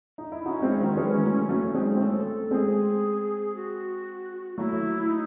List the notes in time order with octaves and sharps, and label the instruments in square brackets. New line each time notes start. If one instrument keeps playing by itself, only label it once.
[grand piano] D#4
E4
[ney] C#4 [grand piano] D#4 F#4
[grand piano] G#3 C4
D#3 F#3
E3 G#3
F#3 A3
[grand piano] F#3 A3 [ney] C#4
[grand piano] G#3 C4 [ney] D#4
[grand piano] C4
[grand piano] A3 C#4 [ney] A4
[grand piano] G#3 C4 [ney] G#4
[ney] F#4
[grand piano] F#3 A3 [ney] E4
[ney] D#4